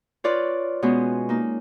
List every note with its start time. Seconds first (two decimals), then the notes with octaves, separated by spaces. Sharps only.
0.24 F4 B4 C#5 D5
0.82 B2 G#3 B3 C#4
1.29 A#3 D#4